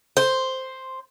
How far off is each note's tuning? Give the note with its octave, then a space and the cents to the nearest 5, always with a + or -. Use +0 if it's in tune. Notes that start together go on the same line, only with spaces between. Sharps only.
C5 +0